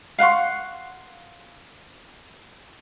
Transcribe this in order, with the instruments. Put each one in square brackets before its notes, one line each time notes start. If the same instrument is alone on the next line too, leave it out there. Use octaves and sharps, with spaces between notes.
[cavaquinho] F5 F#5 C6 C#6